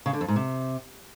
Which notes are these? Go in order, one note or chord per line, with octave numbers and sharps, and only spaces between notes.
C#3
D3
F2
G#2
C3